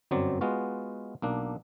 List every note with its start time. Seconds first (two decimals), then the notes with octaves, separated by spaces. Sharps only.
0.11 G1 F#2 F#3 C4 D5
0.41 G#3 B3 F4 F#4
1.22 B1 A#3 D4